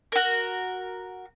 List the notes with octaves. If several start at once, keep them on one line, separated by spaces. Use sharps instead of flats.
F#4 A#4